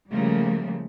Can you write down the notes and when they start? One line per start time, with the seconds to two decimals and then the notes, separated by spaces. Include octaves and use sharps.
0.10 C#3 F3 G3 A3 A#3